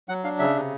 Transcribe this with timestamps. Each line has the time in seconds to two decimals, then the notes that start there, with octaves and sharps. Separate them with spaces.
0.09 F#3 F#5
0.24 D4 F5
0.39 C#3 E5
0.55 C3